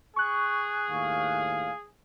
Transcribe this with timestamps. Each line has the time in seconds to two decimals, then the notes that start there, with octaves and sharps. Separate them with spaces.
0.16 G#4 C#6 F#6
0.89 D#2 A2 F5